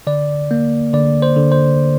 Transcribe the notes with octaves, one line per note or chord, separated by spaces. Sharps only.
D3 D5
A#3
D3 D5
C5
D3
C5